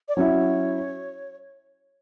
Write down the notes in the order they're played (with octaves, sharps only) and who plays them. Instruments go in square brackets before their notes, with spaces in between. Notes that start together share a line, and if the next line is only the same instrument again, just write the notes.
[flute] D5
[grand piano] F#3 C#4 E4 [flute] C#5